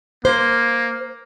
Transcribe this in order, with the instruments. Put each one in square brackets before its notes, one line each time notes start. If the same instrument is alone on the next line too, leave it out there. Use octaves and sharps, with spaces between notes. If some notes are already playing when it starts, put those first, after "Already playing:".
[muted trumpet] A#3 [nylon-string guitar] C5